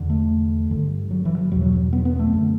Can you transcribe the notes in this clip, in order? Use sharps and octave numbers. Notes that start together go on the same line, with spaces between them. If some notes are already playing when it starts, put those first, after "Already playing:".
Already playing: E2 D3
A3
G2 D3
F#3
E3
F#3
E2 B2 F#3
F#3
F#3
B3
B3
A3
F#2 D3